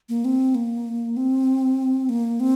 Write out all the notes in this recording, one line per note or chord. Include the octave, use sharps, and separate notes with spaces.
A#3
C4
A#3
C4
A#3
C4